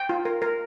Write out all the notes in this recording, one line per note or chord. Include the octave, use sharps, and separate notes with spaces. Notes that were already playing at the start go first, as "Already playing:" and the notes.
Already playing: G5
F4
A#4
A#4